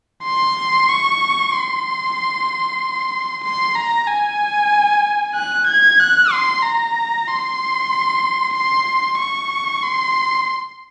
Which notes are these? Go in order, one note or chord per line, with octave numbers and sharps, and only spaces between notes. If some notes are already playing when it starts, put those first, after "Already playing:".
C6
C#6
C6
C6
A#5
G#5
F#6
G#6
F#6
C6
A#5
C6
C6
C#6
C6